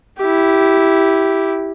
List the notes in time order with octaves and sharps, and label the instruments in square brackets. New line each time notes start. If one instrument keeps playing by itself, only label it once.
[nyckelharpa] E4 G4